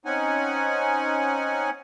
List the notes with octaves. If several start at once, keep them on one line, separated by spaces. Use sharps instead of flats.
C4 C#4 D#4 F#5 G#5